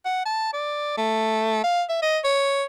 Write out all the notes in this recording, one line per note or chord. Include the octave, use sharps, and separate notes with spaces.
F#5
A5
D5
A3
F5
E5
D#5
C#5